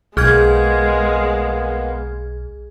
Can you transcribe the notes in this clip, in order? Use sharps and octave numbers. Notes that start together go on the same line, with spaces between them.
B1 G#3 A#3 B3 G#4 F6 G#6